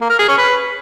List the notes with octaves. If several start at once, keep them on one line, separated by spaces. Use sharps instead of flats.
A#3
A#4
G#4
C#4
B4